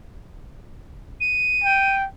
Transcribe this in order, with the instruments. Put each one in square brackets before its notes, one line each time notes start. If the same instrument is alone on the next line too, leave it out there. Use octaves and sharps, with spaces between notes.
[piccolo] D#7
[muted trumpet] G5